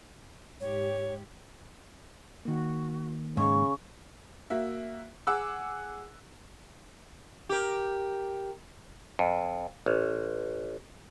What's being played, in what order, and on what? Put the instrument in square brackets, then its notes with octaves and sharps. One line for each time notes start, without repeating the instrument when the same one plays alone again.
[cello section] G#2 G4 [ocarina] C#5
[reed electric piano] D#3 A#3 [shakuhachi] F#4
[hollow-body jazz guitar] G#2 [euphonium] C#3 [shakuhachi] C#6
[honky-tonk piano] A#3 F#4 E5
G#4 F#5 D6 E6 F#6
[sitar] G4 A#4
[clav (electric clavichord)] F2
A1